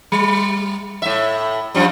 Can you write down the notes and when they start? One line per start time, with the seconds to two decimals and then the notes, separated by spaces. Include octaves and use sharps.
0.12 G3
1.02 A2 E5
1.74 F#2 F3 G3